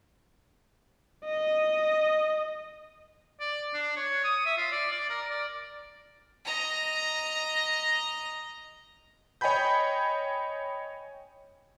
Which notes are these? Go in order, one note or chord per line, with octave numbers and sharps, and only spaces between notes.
D#5
D5
D4
C#5
D#6
E5
F4
D5
D5
A#4
D5
D#5 A#5
C#5 D#5 G5 G#5 B5 G6